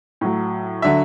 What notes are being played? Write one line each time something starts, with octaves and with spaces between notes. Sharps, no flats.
A2 F#3
D3 F#3 E5